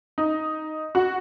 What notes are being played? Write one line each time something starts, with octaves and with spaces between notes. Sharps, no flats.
D#4
F#4